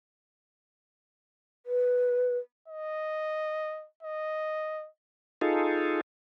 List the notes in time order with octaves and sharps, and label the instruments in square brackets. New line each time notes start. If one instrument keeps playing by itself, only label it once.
[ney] B4
[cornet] D#5
D#5
[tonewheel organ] D#4 F4 G#4 A4